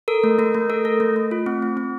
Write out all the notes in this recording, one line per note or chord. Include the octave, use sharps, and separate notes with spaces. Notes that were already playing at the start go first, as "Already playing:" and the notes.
A4 A#4
A3
A3 A#4
A3
A4 A#4
A4
A3
A3
F4
C4
C4
C4